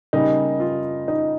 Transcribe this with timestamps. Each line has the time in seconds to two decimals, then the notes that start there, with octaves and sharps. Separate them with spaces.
0.13 C#3 G3 A#3 D#4
0.60 F4
1.08 D#4